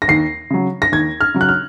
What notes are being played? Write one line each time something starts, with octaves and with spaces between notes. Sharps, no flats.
A#6
D#2 C7
C#3 F#3
A#6
D#2 G#6
F6
C#3 F#3
F#6
F6